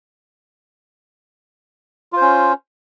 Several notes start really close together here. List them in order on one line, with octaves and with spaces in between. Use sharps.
F4 C5 C#4